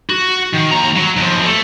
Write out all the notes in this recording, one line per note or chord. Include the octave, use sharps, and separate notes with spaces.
F#4
D#3
D#2 A#5
F#3
D#2 F3
A3